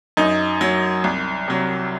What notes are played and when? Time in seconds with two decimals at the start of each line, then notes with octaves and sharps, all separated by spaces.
0.17 F#2 D#4
0.61 F#3
1.04 C2
1.48 C3 F#3